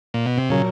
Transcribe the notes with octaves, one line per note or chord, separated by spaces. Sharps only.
A#2
B2
C3
A#2 C#3 F#3 A#3